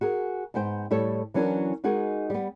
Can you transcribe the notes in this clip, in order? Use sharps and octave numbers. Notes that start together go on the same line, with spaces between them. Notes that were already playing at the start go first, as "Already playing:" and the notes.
F#4 G#4 A#4
G#2 B3 C5 G5
A2 G3 A4 C#5
E3 F#3 C#4 D4 A#4
G#3 D#4 F#4 G#4 A#4
G3 B3